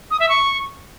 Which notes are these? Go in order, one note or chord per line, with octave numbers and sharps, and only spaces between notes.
D#6
E5
C#6